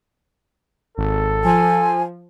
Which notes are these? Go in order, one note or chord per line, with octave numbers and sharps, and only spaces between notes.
G#1 A4
F3 G#5